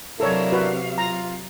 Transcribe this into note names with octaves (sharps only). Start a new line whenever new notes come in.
C3 F#3 D4 E4 A4 A#4 C#5 F5
F#4 B4
F4 A#5